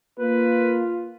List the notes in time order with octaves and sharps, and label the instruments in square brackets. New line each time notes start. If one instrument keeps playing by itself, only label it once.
[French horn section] A#3 [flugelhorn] F4 [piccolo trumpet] B4